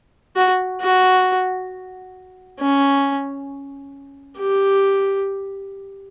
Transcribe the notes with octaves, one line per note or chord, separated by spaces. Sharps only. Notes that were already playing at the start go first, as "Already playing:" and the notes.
F#4
F#4
C#4
G4